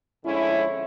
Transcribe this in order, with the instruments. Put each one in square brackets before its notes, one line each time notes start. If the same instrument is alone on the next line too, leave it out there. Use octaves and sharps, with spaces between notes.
[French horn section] F2 D3 G#3 C#4 E4